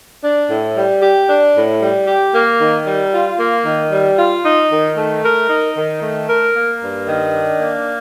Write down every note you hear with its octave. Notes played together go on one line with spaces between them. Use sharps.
D4
A2
G3
G4
D4
A2
G3
G4
A#3
D#3
G3
F4
A#3
D#3
G3
F4
D#4
D#3
A3
A#4
D#4
D#3
A3
A#4
A#3
G2
D#3
D4
A#3